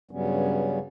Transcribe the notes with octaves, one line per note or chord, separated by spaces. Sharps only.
G2 C#3 F#3 G3 B3 C#4